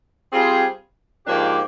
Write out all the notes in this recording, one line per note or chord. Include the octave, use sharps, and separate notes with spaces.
G3 C4 F4 G#4
G#2 F3 A#3 D4 G4